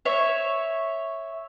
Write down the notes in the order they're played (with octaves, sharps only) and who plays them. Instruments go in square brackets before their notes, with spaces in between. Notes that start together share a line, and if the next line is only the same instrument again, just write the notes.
[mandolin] C#5 E5